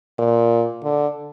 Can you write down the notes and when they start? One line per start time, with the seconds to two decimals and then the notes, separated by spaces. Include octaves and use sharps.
0.19 A#2
0.84 D3